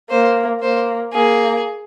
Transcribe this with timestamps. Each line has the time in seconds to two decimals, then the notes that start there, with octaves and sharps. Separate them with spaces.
0.10 A#3 C5
0.61 A#3 C5
1.13 A#3 G#4